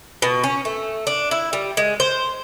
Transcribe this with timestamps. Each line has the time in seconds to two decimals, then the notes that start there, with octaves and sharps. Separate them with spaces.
0.22 B2
0.44 C#4
0.65 A3
1.07 D4
1.31 E4
1.53 G3
1.77 G#3
2.00 C5